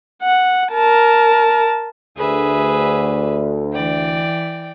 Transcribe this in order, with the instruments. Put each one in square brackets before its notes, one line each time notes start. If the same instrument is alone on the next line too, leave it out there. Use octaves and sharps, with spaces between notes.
[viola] F#5
A#4 A5
[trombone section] D2 [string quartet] G#4 B4 E5
[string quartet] E3 D5 G5